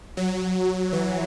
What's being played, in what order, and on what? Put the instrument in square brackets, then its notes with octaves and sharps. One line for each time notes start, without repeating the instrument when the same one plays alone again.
[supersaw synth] F#3
E3